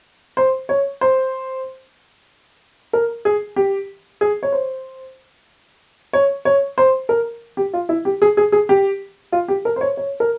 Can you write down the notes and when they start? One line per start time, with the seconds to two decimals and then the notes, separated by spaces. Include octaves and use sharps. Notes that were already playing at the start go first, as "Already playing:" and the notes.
0.37 C5
0.69 C#5
1.01 C5
2.93 A#4
3.25 G#4
3.56 G4
4.21 G#4
4.43 C#5
4.52 C5
6.13 C#5
6.45 C#5
6.78 C5
7.09 A#4
7.57 G4
7.73 F4
7.89 E4
8.05 G4
8.22 G#4
8.37 G#4
8.52 G#4
8.69 G4
9.32 F4
9.48 G4
9.65 A#4
9.76 C5
9.81 C#5
9.97 C#5
10.20 A#4